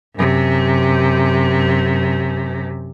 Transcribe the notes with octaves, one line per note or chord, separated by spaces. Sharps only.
F#2 C3